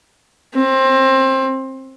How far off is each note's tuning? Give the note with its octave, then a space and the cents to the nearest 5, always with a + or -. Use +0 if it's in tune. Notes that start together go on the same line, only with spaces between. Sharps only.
C4 +20